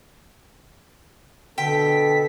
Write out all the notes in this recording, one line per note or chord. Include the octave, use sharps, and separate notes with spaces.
B2 D3 A4 G5 B6